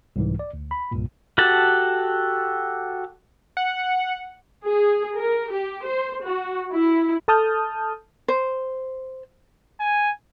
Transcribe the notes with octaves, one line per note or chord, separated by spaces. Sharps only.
C2 G#2 E3
D5
D2
B5
C2 G2 A#2
F#4 G4 A4 F#5 A5
F#5
G#4
A#4
G4
C5
F#4
E4
A4 A5 D#6 F6 G6
C5
G#5